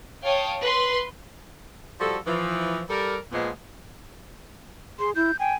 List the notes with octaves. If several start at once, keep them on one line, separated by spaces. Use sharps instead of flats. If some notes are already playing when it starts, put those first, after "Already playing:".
C#5 F5 G5 A5 D#6
B4 C6
F3 G3 F#4 A4
E3 F3
G3 A4 A#4
A#2 F3 G#3 B3
G#4 C6
E4 G6
G5 G#5